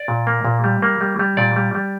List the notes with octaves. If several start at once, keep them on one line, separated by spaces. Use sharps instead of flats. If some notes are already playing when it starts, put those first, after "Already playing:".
Already playing: D5
A#2
A#3
A#2
G3
A#3
G3
G3
A#2 D5
G3
G3